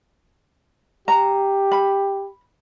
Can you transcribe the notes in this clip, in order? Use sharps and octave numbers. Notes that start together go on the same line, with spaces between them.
G4 A#5
B5